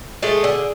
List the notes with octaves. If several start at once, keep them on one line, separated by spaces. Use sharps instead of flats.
G#3 A3 G#4
D3